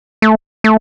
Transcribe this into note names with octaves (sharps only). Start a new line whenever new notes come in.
A3
A3